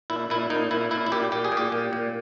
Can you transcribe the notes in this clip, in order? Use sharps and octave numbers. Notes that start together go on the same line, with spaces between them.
A#2 E4
A#2 E4
A#2 D#4
A#2 E4
A#2 E4
E4
A#2 G4
A#2 G4
G#4
A#2
G4
A#2
A#2